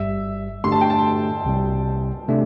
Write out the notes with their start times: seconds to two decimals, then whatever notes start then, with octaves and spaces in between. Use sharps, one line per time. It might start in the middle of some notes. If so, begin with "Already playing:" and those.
Already playing: G1 G2 G3 E5
0.64 G2 D3 A3 D4 G4 C6
0.72 A5
0.81 G5
0.90 A5
1.45 C2 C3 G3
2.28 C3 A3 D4